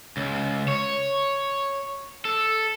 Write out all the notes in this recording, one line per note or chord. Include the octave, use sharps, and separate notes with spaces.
C#2
C#5
A4